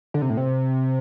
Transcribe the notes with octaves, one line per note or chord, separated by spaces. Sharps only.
D3
C3
A2
C3